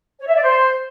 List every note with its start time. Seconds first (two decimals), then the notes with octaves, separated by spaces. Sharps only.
0.20 C#5
0.28 E5
0.35 D5
0.43 C5